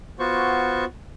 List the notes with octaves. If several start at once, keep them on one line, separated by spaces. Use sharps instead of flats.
B3 F4 F#4 C5 C#6